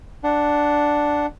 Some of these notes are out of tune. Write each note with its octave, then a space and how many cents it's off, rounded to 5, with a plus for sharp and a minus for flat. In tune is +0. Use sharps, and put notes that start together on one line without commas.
D4 +0 F#5 +0